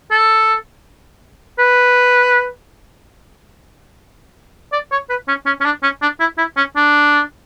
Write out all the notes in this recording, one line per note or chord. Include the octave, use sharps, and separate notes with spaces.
A4
B4
D5
C#5
B4
C#4
C#4
C#4
D4
C#4
D4
E4
E4
C#4
D4